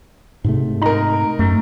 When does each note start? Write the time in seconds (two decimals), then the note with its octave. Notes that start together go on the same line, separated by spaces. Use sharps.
0.44 G#2 C3 A3
0.82 D#4 A#4 A#5
1.39 F#2 A3